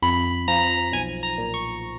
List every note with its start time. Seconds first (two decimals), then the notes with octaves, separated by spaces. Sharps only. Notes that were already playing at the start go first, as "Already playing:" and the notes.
0.02 F2 B5
0.48 F3 A#5
0.93 B1 G#5
1.23 A#5
1.38 A#2
1.54 C#6